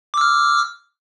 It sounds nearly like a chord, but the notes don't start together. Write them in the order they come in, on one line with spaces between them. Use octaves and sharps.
D6 E6 F6